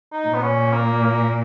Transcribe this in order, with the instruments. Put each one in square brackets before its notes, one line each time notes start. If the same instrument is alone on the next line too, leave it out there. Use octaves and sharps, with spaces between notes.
[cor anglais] D#4
[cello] A#2
[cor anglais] B3
C#4
A#3
A#3